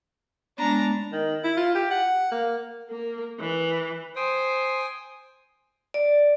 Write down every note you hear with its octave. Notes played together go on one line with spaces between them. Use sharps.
G#3 B3 D4 A#5
D#3
E4
F4
G4
F#5
A#3
A#3
E3
C5 G5 G#5 D#6
D5